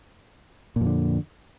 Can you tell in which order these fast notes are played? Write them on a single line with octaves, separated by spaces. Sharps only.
A#2 F2 D3